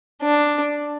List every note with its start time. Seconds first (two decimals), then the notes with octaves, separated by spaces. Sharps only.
0.23 D4